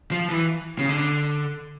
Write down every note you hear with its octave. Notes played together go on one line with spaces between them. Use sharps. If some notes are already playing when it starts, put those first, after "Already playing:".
F3
E3
C#3
D3